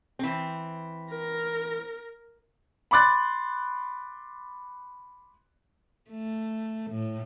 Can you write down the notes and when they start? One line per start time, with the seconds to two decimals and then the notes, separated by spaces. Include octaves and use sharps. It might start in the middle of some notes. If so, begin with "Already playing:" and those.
0.19 E3 C4
1.10 A#4
2.91 B5 C6 D6 F#6 A6
6.10 A3
6.91 A2